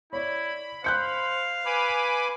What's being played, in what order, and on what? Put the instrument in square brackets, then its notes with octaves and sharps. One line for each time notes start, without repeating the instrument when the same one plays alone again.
[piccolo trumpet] E4 [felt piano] C#5 D5 [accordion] B5
[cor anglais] C5 [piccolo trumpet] F5 [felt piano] F#6 G6 C#7
[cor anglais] B4 [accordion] G#5 B5 D6